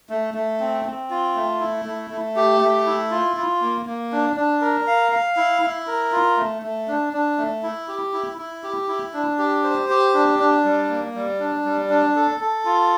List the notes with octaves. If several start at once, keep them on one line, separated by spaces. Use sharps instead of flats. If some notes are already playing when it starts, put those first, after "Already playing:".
A3
A3
C4
C4
F4
A3
E4
A3
A3
G4
A3
E4
F4
F4
A#3
A#3
D4
D4
A#4
F5
F5
E4
E4
A#4
F4
A3
A3
D4
D4
A3
E4
G4
E4
E4
G4
E4
D4
G4
C5
G4
D4
D4
G3
A#3
G3
D4
G3
D4
A4
A4
F4